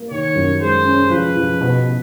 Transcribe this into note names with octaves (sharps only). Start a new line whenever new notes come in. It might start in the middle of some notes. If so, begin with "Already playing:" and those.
Already playing: A#3
D#3 C#5
F#2
G#3 C5
C#4
F3 B4
F3
B2
B2